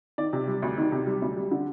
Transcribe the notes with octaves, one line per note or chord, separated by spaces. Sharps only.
D#3 D5
C3
G3
D2
D#3
C3
G3
D2
G3
D3